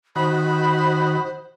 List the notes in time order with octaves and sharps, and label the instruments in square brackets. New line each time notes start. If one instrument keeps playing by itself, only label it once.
[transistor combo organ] D#3 F#4 [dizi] C5 [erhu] B5